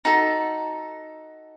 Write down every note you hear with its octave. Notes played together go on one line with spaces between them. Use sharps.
D#4 F#4 A4